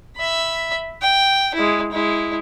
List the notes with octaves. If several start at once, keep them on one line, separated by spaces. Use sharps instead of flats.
E5 B5
G5
G#3 E4
G#3 E4